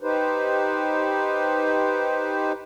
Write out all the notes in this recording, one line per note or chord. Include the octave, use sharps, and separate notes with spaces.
D#4 G4 B4 C5